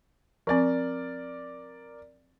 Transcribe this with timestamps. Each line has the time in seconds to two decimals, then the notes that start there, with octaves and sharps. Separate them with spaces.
0.47 F3 C4 A#4 D5